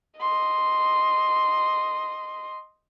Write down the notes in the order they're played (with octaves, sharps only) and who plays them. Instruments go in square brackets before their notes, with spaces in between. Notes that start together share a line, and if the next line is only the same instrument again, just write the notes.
[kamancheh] D#5 C6